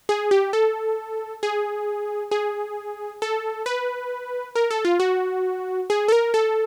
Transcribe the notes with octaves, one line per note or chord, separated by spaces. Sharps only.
G#4
G4
A4
G#4
G#4
A4
B4
A#4
A4
F4
F#4
G#4
A4
A#4
A4